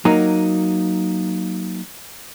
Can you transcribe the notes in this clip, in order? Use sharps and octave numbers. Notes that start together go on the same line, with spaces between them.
F#3 A#3 D#4